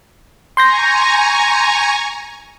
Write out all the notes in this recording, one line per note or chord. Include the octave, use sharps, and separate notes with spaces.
G#5 A#5 C6 C#6 G6 A#6